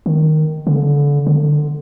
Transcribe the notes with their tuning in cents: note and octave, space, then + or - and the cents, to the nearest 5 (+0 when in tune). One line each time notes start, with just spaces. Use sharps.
D#3 -5
D3 -30
D3 +15